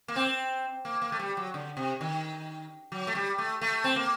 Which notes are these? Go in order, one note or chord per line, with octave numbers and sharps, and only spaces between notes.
A#3
C4
A#3
A#3
A3
G3
F#3
D3
C3
D#3
F#3
A3
G3
A3
A3
C4
A#3